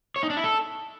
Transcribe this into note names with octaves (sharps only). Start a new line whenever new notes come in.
C#5
D#4
D4
E4
A4